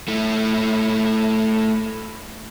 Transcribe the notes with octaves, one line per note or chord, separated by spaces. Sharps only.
A3 E4